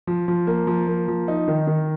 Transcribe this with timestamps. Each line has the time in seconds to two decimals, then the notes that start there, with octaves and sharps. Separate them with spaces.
0.07 F3
0.28 F3
0.47 A#3
0.67 F3
0.87 A#3
1.08 F3
1.28 D#4
1.48 D#3
1.67 D#3